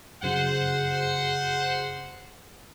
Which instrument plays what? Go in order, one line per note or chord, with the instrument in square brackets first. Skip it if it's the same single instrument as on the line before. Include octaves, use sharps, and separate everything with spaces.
[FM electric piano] F#2 C#3 [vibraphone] F#4 G#4 [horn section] C5 F#5